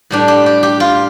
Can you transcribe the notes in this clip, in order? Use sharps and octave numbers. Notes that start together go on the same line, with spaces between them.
A2 G3 D4
G4
G4
G4
F4